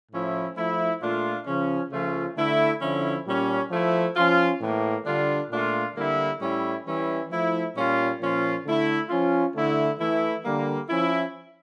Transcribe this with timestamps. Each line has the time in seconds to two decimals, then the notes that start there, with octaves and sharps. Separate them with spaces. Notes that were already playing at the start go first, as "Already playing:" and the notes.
0.12 A2 F3 C#4 E4
0.57 F3 A3 E4
1.02 A#2 A3 D4 F4
1.47 C#3 F3 C#4
1.92 C#3 F3 A3 C#4 F4
2.37 D3 A3 E4
2.82 D3 F3 C#4 E4
3.27 A#2 G3 C#4
3.71 F3 A3 E4
4.16 F3 C#4 F4
4.61 A2 E3 A#3
5.06 D3 G3 D4 F4
5.51 A#2 A3 D4 F4
5.96 D3 G3 A#3 E4
6.40 A2 G3 C#4 E4
6.86 E3 G3 C#4 E4
7.31 F3 A3 E4
7.76 A#2 G3 C#4 F4
8.20 A#2 F3 C#4 F4
8.66 D3 A3 E4
9.10 F3 C#4 F4
9.55 D3 A3 E4
10.00 E3 A3 E4
10.45 D3 G3 A#3
10.89 F3 C#4 E4